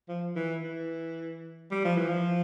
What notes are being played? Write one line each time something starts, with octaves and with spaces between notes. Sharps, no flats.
F3
E3
E3
G3
F3
E3
F3